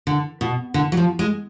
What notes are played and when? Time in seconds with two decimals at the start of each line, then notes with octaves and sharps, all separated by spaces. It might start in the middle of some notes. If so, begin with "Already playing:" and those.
0.07 D3
0.41 B2
0.74 D3
0.92 F#3
0.97 F3
1.19 G#3